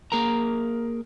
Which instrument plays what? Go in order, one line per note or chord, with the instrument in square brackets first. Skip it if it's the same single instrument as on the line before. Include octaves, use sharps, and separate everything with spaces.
[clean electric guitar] A#3 G#4 A#4 A#5